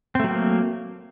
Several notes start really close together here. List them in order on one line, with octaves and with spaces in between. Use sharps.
C4 A3 F#3 A#3